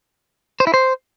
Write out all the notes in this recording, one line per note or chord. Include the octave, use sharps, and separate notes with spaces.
C5
E4
C5